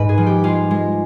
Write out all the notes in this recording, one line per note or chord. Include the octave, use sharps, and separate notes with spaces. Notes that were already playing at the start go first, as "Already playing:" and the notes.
Already playing: G#2 G#3 D#4 B4
G#4
F3
G4
G#3 F4
G#3